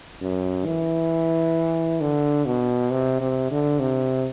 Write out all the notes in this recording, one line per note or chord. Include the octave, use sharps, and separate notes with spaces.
F#2
E3
D3
B2
C3
C3
D3
C3